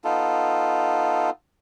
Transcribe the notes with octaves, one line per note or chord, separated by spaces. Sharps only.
B3 D#4 F4 A4